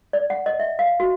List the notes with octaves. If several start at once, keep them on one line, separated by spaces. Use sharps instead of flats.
D5
F#5
D#5
E5
F5
F#4